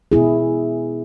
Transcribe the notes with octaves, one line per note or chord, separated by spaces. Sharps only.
B2 B3 E4 G#4